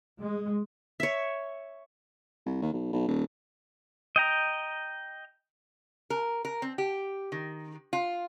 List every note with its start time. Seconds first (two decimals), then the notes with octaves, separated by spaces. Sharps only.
0.19 G#3
1.00 C#5 E5
2.46 C2
2.62 D#2
2.74 B1
2.93 B1
3.08 D#1
4.16 D#5 G5 A#5
6.10 A#4
6.45 A#4
6.62 C4
6.78 G4
7.32 D#3
7.93 F4